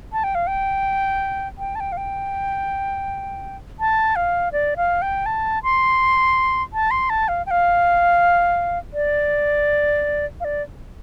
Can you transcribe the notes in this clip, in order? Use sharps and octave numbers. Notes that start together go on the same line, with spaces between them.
A5
G5
F5
G5
G5
A5
G5
F5
G5
A5
F5
D5
F5
G5
A5
C6
A5
C6
A5
F5
G5
F5
D5
F5
D5